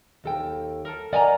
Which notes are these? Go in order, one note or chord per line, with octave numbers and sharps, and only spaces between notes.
D#2 A4 G5
A4 A#4
A#4 D5 D#5 F#5 G#5 A#5